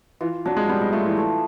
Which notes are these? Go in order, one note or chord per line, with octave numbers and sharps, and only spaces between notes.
E3 F4
F#3 D4
G#3
G3 B3
G#3
A3 F4
E3
A3